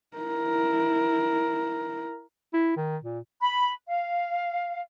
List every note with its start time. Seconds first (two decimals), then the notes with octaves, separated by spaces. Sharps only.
0.17 E4 A#4
2.53 E4
2.77 D#3
3.04 A#2
3.42 B5
3.88 F5